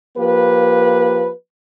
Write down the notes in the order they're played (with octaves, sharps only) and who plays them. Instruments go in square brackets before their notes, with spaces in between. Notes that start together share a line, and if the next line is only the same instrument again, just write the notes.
[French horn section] F3 A#3 G4 B4